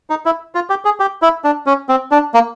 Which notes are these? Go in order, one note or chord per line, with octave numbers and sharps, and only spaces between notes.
D#4
E4
F4
G4
G#4
G4
E4
D4
C#4
C4
D4
A#3